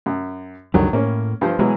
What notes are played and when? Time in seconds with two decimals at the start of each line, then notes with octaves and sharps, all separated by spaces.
0.06 F#2
0.74 C#2 F#2 D3 D#3 F#3 G3
0.93 A2 A#3 C#4
1.41 G2 F3 C5
1.59 B2 E3 F#3 G#3